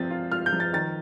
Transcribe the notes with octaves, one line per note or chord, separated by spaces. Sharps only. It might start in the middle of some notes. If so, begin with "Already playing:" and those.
Already playing: F3 C4 A6
F4
F4 F6
G6
F3
A6
D#3 A6